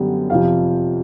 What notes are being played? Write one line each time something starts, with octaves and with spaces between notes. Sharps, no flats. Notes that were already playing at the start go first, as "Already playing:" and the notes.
Already playing: F#2 D3 G3 B3
F2 C3 F3 F5